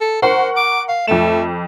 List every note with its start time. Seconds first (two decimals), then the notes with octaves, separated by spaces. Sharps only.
0.01 A4
0.22 A#4 C5 F#5 C#6
0.56 D6
0.88 F5
1.07 F2 A3 E7